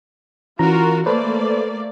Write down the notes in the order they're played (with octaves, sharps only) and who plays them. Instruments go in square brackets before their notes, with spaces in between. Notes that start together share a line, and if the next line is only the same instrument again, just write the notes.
[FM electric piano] E3 C#4 A#5 [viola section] F4 F#4 A#4
[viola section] A3 A#3 D5 [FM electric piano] A4 B4 C5